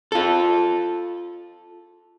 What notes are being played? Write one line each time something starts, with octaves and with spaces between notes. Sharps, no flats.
F4 A4